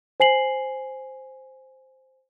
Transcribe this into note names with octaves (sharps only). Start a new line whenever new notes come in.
C5 G#5 C7 F#7